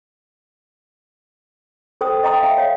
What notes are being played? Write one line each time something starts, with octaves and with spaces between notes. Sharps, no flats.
A4 C5 G5 D#6
D#5 G5 A#5 D#6
E5 F5 G5
C#5 F5